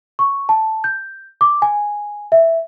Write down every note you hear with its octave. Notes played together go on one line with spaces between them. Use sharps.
C#6
A5
G6
D6
G#5
E5